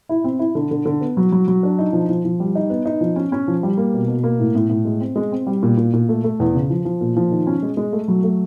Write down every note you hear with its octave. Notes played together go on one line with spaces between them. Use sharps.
E4
C4
E4
D3
D3
D3
B3
F#3
F#3
F#3
D4
D#4
F3
F3
F3
G3
D#4
B3
D#4
F3
C#4
C#4
F3
G3
A#3
B2
B2
A#3
A2
A2
A2
G#3
C4
G#3
C4
G3
A#2
A#2
A#2
A3
A3
E2
C#3
F3
F3
A#2
F3
D#3
C#4
G#3
G#3
A3
F#3
A3